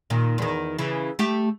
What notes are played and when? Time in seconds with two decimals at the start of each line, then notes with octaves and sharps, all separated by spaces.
0.10 A#2 D#3
0.38 E2 D#3
0.79 C#3 E3
1.19 A3 G4